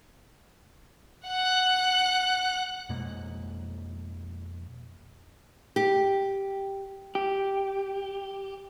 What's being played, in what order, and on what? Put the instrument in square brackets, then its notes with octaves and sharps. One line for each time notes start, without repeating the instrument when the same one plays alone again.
[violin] F#5 F#6
[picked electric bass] F2 B2 G#3 A#3
[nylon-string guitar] G4
[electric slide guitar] G4